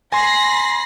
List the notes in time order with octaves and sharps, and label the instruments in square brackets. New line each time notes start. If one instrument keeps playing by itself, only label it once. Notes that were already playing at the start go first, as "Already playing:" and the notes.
[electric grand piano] G#5 C6 [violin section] B5 A#6 C7